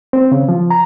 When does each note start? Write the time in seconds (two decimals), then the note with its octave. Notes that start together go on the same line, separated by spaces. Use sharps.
0.13 C4
0.32 C#3
0.49 F3
0.70 A#5